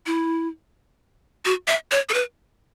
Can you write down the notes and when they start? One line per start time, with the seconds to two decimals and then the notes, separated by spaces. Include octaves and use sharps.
0.06 E4
1.45 F#4
1.68 E5
1.91 C#5
2.09 A4
2.14 B4